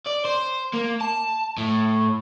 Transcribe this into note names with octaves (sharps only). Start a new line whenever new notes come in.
D5
C5
A#3
A5
A2